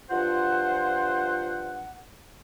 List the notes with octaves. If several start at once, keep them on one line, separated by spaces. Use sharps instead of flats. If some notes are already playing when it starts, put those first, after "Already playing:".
G2 F3 F4 C5 F#5